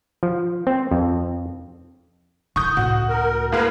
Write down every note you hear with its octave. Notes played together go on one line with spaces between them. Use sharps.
F3
C4
F2
D3 E4 C#6 D#6 G6
C#2 A2 F#4
A#4
A2 G#3 A#3 A#4 B4 F5